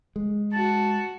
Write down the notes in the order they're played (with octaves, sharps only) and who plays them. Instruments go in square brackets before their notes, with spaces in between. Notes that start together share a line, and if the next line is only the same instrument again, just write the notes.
[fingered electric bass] G#3
[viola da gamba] F#4 [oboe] A5